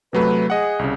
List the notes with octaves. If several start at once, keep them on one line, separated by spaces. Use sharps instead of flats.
C3 F#3 A3 B4
G#4 D#5 F#5
C2 C#3